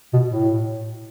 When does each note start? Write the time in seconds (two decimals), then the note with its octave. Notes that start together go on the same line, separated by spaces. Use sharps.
0.13 B2
0.28 A2